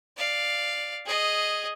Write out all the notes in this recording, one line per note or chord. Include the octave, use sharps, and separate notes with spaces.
D5 F5
G#4 D#5